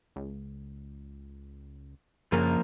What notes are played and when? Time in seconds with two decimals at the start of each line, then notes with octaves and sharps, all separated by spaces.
0.16 C#2
2.32 F#2 C#3 F3 A#3 A#4